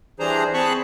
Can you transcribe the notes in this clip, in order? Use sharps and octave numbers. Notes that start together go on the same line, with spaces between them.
E3 G3 D4 G#4 C5 A#5
C4 G#4 A5 B5 C#6 F#6